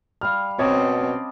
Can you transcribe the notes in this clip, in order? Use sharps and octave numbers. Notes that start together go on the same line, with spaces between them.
G3 F5 F6
B2 C4 C#4 C#5 D#5 A5 D6